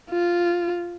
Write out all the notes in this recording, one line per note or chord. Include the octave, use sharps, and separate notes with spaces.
F4